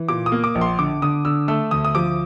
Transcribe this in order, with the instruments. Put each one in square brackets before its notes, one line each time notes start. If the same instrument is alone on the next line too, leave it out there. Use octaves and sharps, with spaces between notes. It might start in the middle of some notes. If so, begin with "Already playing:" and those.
Already playing: [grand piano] E3
A#2 D6
D#6
A#3
D6
A#1
C6
D3 D6
D3 D#6
D3 E6
A3 E6
D2 D#6
D#6
F3 D6